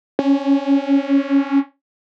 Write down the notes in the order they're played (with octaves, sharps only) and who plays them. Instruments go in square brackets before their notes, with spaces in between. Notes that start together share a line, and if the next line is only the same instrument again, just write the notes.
[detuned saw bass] C#4